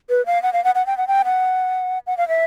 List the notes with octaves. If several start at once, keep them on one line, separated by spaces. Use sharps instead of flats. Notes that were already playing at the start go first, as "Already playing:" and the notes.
B4
F5
F#5
F5
F#5
F#5
G5
F#5
G5
F#5
F#5
F5
E5